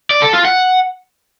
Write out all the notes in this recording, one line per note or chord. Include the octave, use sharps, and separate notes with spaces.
D5
A4
F4
F#5